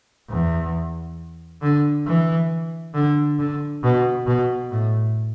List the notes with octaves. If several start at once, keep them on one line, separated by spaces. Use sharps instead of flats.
E2
D3
E3
D3
D3
B2
B2
A2